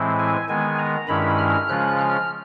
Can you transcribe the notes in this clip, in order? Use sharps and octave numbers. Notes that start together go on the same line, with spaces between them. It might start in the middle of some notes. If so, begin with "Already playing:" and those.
Already playing: A2 E3 G#3 C4 E4
G#5
D#3 G#3 B3 G#5
A#5
G2 D#3 G#3 C#4 E4 B5
F6
C#3 F3 G#3 C#4 F4 F#6
F6